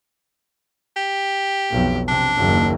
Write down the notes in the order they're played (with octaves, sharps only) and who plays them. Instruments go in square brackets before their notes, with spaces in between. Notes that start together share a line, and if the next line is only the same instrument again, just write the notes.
[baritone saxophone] G4
[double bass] B1 F2
[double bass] C3 [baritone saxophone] D4
[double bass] F#1 D#2